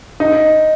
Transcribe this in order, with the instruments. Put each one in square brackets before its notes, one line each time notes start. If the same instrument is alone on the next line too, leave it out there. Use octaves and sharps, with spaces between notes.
[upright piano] D#4